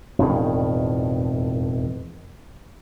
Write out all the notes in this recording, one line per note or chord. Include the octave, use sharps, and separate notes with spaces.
E1 F2 A2 D#3